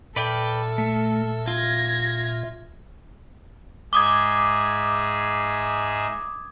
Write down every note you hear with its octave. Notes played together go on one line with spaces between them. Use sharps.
A#2 A4 B4 D5 E5 G5
A3
F4 G#6 A#6
G#2 G#4 E5 D6 D#6 G#6